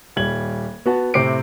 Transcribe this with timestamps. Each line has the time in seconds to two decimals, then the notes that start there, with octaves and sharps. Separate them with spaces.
0.16 D#1 G3 G#6 F#7
0.86 B3 F#4 A5
1.14 A2 C3 C4 D6 C7 D7